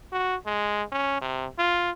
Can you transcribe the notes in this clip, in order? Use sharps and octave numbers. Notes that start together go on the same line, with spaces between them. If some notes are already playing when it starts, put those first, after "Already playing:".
F#4
G#3
C#4
C3
F4